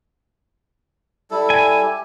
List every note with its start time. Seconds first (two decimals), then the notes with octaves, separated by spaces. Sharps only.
1.31 G3 E4 A4
1.50 G#5
1.82 G4